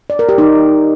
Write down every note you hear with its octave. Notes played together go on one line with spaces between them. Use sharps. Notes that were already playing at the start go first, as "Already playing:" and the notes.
D5
A#4
G4
D#4